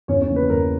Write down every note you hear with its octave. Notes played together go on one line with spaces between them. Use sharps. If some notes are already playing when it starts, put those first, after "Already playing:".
E2 C#4 C#5
C#4 C#5
C#3 F3 A#3
B4
E2 A#4